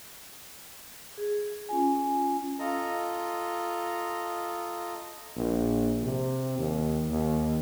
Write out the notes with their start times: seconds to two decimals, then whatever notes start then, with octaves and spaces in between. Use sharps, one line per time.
1.18 G#4
1.69 C#4 F4 G#5
2.59 F4 A4 D#5 A#5
5.36 A#1
6.03 C3
6.58 D#2
7.09 D#2